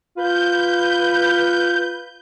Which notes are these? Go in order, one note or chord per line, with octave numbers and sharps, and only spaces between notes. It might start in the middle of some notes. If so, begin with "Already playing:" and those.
F4 B4 G6